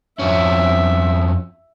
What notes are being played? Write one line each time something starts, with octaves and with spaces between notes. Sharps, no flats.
F2 C#4 E5